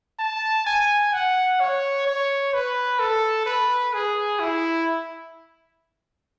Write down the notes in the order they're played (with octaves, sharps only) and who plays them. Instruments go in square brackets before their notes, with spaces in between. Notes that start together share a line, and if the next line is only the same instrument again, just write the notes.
[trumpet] A5
G#5
F#5
C#5
C#5
B4
A4
B4
G#4
E4